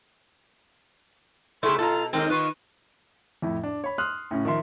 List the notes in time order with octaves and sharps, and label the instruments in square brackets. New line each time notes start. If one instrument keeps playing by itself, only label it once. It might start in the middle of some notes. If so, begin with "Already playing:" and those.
[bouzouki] C#3 A3 [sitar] E4 G4 [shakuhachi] C6
[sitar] B2 [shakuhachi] F4 [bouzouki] A4 A#5
[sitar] D#2 G#3 D#4 [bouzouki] C4 [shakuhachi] A#4
[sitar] D#3 F4 [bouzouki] B4 [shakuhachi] C#6
[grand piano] F2 A2 E4
D4
C#5 B5
C6 D#6 F6 F#6
A2 C#3 C#4
D#3 F3 E5 C6